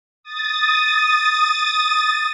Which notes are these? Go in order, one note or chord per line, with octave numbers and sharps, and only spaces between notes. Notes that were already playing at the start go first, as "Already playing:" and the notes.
D#6 A6